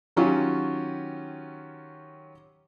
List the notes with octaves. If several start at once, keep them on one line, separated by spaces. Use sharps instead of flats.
D#3 F#3 C#4 F4 G4